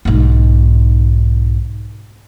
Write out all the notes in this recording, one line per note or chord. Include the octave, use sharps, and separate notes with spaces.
B1 G#2